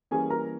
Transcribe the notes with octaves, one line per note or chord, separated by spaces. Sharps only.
E3 G3 A#3 C#4 G#4 G#5
A#4 A#5